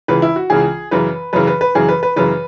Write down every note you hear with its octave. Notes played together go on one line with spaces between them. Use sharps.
C#2 C#3 E3 B4
E4
F#4
C#2 C#3 E3 G#4
F#2 C#3 E3 B4
F#2 C#3 E3 B4
B4
B4
F#2 C#3 E3 G#4
B4
B4
F#2 C#3 E3 B4